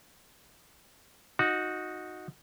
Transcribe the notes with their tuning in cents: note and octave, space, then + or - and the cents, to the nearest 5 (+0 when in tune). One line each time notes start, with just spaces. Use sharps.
D#4 +0 F#4 -15